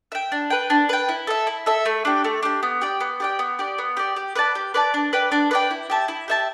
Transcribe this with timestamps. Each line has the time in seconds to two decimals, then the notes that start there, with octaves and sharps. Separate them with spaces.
0.12 E5 G5
0.32 D4
0.50 B4 G5
0.70 D4
0.89 B4 G5
1.09 E4
1.27 A4 E5
1.47 E4
1.66 A4 E5
1.86 A3
2.05 D4 G4
2.24 A3
2.43 D4 G4
2.63 B3
2.81 G4 D5 G5
3.00 B3
3.20 G4 D5 G5
3.39 B3
3.59 G4 D5
3.78 B3
3.97 G4 D5
4.16 G4
4.36 B4 D5 A5
4.55 G4
4.74 B4 D5 A5
4.94 D4
5.13 B4 D5 G5
5.32 D4
5.51 B4 D5 G5
5.71 E4
5.90 G4 E5 A5
6.08 E4
6.28 G4 E5 A5